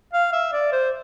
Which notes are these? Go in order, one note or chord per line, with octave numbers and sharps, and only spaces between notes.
F5
E5
D5
C5